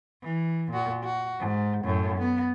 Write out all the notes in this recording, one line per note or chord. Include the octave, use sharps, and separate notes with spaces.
E3
A#2 F#4
F#4
G#2
F#2 A2
B3